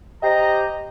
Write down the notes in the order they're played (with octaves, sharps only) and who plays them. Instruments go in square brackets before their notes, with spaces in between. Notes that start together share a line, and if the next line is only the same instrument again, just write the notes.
[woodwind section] G4 C5 A#5 [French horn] D#5